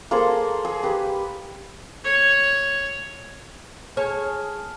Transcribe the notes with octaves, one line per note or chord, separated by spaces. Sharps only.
A#3 G#4 A4 C5
G#4
G4 B4
C#5
G#4 C#5 A5 F6